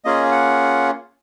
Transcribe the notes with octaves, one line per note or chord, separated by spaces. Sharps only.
A#3 C#4 F4 G#4 D#5
F#5